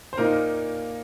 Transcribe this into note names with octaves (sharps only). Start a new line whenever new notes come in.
C5
A#2 A#3 D#4 A#4